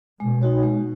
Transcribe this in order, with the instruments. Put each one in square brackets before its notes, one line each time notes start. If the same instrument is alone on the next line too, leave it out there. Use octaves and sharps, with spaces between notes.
[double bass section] B2 [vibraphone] G#3
[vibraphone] D#4 F#4 C#5
G#3